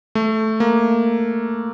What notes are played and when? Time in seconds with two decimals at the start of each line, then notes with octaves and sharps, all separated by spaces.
0.15 A3
0.60 A#3